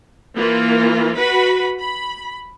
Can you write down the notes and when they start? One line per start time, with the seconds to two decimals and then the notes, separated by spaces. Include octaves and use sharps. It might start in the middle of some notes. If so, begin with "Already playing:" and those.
0.36 E3 A#3 F4
1.17 F#4 B4 B5
1.77 B5